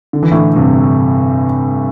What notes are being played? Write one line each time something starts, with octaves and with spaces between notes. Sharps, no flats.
D3
E3
A2 D3
G2 C3